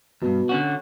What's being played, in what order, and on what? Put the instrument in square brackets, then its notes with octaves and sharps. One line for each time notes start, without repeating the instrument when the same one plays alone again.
[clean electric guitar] E2 G2 [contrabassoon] B2
[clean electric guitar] D3 C#4 F#4